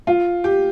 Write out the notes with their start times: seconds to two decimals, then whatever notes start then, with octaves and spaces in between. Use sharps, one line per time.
0.07 F4
0.44 G4